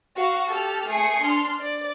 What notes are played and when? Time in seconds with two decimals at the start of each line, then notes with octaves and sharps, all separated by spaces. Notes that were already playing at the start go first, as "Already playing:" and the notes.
0.15 F#4 F5
0.48 G4 A4 F6
0.88 A3 G#4 G#5 C7 C#7
1.23 D4 C6 F6
1.61 D5